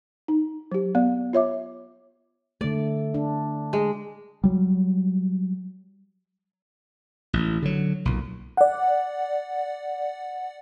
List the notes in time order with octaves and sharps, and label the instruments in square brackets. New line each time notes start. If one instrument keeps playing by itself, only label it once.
[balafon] D#4
F#3 G4
B3 D5
F4 C#5 E5 D6
[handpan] D3 A3 [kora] D5
[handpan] D4
[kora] G#3
[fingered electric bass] F#3 G3
[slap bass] A1
D3 F#3
B1 A#2
[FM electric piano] D5 F#5